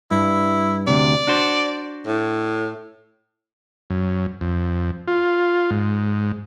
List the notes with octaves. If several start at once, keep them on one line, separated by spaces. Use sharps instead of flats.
G2 E4
D2 C3 D5
D4 F#4 C5
A2
F#2
F2
F4
G#2